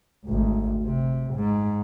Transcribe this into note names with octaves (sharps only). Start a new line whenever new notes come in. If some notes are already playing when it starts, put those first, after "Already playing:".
G#1 D2
C3
G#2